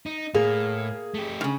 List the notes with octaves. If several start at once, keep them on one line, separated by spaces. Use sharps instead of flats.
D#4
A2 A#3 G#4
A3 G4
A2 C#3